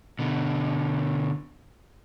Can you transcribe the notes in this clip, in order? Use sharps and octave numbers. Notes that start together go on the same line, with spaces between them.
B2 D3